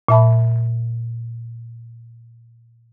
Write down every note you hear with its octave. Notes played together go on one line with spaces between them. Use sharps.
A#2 E5 A5 B5